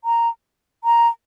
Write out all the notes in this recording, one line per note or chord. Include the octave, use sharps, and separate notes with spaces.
A#5
A#5